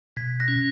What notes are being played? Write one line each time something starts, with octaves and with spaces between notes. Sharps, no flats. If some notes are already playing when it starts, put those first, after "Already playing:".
B2 G#6 B6
F#6 A#6
C#4